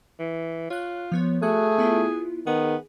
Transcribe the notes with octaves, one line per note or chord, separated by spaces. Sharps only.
E3
F4 C#5 F#6
F3 B3 C#5
A3 F#4 G#4 F#6
B3 E4 F4
D#3 B3 G#4